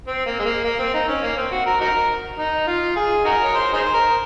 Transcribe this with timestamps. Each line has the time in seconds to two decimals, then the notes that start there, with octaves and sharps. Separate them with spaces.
0.07 C4
0.26 A#3
0.39 G#3
0.46 A#3
0.64 A#3
0.79 C4
0.94 D#4
1.08 C#4
1.23 A#3
1.37 C4
1.52 F#4
1.66 A#4
1.81 D#4 F#4 A#4
2.39 D#4
2.67 F4
2.96 G#4
3.25 D#4 F#4 A#4
3.43 C#5
3.54 C5
3.74 D#4 G#4 C5
3.94 A#4